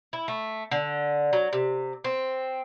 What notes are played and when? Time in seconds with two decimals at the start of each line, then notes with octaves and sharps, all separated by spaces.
0.13 E4
0.28 A3
0.71 D3
1.33 F#3
1.53 C3
2.04 C4